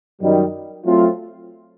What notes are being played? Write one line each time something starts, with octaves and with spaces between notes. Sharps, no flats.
F#2 D#3 G3
F#3 A3 C4 F4